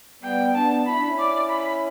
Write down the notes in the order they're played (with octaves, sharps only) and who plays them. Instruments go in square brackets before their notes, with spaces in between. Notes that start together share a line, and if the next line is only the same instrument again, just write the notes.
[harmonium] G3 B3 [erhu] G5
[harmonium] B3 D4 [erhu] A5
[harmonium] E4 [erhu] B5
[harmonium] D4
C#4 E4
[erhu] D5
B5